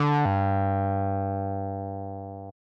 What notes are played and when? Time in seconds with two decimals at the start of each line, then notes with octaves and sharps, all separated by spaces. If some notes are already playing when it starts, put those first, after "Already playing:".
Already playing: D3
0.25 G2